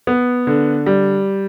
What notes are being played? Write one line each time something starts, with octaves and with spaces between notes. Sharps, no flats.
B3
D3
G3